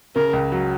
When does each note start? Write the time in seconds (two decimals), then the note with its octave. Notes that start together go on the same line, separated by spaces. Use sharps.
0.16 C#3 A#4
0.33 C#2
0.52 F#3